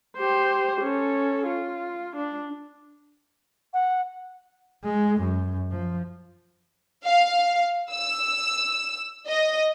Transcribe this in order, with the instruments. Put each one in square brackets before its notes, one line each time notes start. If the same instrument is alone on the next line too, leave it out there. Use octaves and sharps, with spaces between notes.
[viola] G4 C5
C#4 A4
F4
D4
[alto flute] F#5
[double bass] G#3
F#2
F3
[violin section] F5
E6
D#5